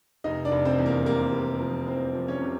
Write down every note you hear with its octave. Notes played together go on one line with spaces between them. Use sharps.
F1 D#4 D#5
D4 D5
F1
C4 C5
E2
A#3 A#4
C3 A#3 A#4
F1
F3
E2 C4 C5
F3
C#4 C#5
C3